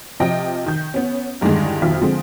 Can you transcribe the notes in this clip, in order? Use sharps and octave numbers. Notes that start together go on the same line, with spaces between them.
C3 F3 D#5 G5 D7
D#3 G6
B3 C#4
E2 G2 D3 D#3 G#3
F2 B2 D#3 F4 E5 B6
D3 F3 G#3 C4